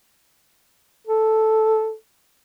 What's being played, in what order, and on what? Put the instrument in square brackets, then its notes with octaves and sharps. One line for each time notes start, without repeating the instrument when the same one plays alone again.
[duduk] A4